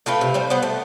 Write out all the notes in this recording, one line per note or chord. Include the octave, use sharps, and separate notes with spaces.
A3 F4 B4 G5
C3
G3 C5
B3 C5 F#5
A3